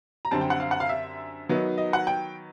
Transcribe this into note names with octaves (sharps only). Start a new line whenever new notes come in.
A#5
F#2 D3 G3 C4 A5
G5
F#5
F5
F#5
F5
E5
D#3 F#3 B3 D#4
D#5
F#5
G5